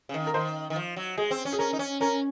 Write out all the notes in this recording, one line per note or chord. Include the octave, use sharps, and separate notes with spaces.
C#3
D#3
A#4
D#3 C5
D#3
F3
F#3
G#3 G#4
C4
C#4
G#4
C#4 A#4
D#4
C#4
C#4 A#4